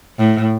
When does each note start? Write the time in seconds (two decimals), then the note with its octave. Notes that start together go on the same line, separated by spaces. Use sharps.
0.18 A2